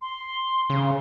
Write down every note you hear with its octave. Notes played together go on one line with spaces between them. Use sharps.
C6
C#3